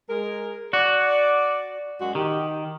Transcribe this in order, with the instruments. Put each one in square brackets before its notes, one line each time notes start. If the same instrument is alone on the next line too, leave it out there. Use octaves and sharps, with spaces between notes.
[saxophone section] G#3 A#4
[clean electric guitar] F#4 [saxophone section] D5
[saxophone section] F#2 G#3 F#4
[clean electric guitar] D#3 [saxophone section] G4